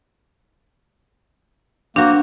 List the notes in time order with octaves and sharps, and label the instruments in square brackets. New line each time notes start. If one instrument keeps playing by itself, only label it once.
[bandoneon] A#3 [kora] C4 F#4 [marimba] D4